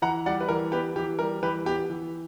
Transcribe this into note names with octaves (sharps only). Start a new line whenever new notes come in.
E3 F#5 A#5
G3 D5 F#5
B4
E3 A#4
B3 G4 B4
E3 G4
G3 A#4
E3 G4 B4
B3 G4
E3